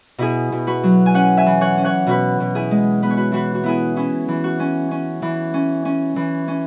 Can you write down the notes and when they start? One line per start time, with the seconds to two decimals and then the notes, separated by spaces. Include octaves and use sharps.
0.18 B2 E4 G#4
0.52 B2
0.67 F#4 B4
0.83 F#3
1.06 G#5
1.14 C#4 C#5 F#5
1.37 E5 G#5
1.46 E3
1.61 C#5 F#5
1.78 C#4
1.85 C#5 F#5
2.07 B2 F#4 B4
2.40 B2
2.55 E4 G#4
2.71 G#3
3.02 B3 B4
3.10 C#5
3.17 F#4 B4
3.32 E3 F#4 B4
3.55 F#4
3.64 B3 E4 G#4
3.97 C#4 E4
4.28 E3
4.44 F#4
4.60 C#4
4.91 C#4
5.22 E3
5.54 C#4
5.85 C#4
6.16 E3
6.48 C#4